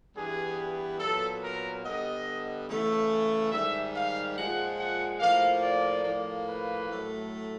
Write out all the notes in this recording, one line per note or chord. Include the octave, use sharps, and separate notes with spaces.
G2 E3 G3 B3 G#4
A#2 F#3 B3 A4
A#4
D3 G3 B3 D#5
C#3 E3 A3
G#2 D#3 G3 E5
F5
A#2 F3 G#3 F#5
F#5
A2 F3 A#3 F5
D5
A2 F3 A#3
B4
A2 F#3 A3